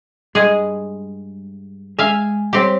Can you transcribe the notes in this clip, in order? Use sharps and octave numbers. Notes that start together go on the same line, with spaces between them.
G2 G#3 G#4
G#3 G#4 E5 F5
G3 C4 G4 C5 C#5